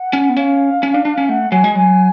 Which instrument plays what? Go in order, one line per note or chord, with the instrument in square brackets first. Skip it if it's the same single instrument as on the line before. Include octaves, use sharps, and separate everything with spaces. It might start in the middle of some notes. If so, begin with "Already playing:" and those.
Already playing: [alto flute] F#5
[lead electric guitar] C#4
B3
[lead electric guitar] C#4 [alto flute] F5
[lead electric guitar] C#4
D4
D4
C#4
[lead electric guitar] A3 [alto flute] F#5
[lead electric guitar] F#3 [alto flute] G#5
[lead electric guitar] G#3
[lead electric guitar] F#3 [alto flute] G#5